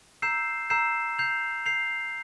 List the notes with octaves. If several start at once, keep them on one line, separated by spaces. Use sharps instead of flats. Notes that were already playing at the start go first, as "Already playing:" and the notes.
A#5 E6 G6 C7 E7
A#5 E6 G6 C7 E7
G6 C7 F7
G6 C7 F7